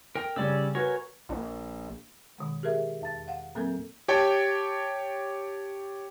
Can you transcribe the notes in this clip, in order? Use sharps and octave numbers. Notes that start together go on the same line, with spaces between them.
A#4 G5
C#3 G3 C#4 D5 E6
F#4 A#4 B4 C#5 G#5
A#1
B2 D#3 G#3
G4 G#4 A#4 E5
E2 A5 A6
F5 F#5
A#2 F#3 A#3 C4 A4 A#4
G4 C#5 G5 A5